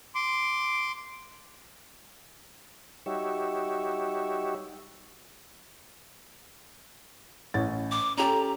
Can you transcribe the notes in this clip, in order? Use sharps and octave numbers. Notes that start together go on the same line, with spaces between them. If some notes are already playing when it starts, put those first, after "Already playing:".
C6 D6
G3 D#4 F#4 G4 C#5 E5
A1 C#4 A6
D6
C#4 G4 A4 A#5